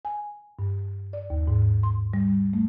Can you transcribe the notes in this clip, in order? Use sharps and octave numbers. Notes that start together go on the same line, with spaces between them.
G#5
G2
D5
D#2
G#2
C6
G3
A3